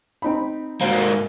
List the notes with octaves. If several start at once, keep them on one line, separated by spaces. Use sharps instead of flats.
C4 D#4 B5
G#2 A#3 F#4 C5